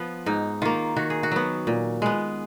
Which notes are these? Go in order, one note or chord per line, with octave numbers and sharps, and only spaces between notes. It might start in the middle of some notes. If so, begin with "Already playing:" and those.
Already playing: F3 B3
G#2 D#4
D#3 A#3 F4
D#3 F#4
G#4
F#4
F#3 B3
A#2
G#3 B3